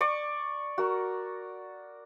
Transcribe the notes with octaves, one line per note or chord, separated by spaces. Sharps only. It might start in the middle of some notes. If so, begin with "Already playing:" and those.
D5 C#6
F#4 A#4